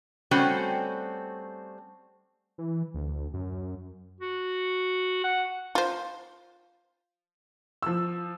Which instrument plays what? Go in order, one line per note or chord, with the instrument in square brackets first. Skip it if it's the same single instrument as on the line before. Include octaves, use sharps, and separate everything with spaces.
[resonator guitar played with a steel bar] G3 A3 C4 C#4 F#4
[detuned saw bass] E3
D2
F#2
[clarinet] F#4
F#5
[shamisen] F4 C5
[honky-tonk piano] F3 E6